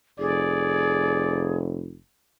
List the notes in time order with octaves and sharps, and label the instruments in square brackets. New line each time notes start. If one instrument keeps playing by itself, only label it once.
[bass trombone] F1 [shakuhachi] G#4 [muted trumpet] D5